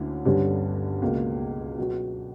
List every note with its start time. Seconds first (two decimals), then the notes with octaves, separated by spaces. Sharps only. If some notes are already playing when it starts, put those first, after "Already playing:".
Already playing: D2 D3 A#3 C#4 E4
0.25 G1 G2 D3 G3 C#4
1.02 C#2 B2 A#3
1.78 B2 F#3 B3 F#4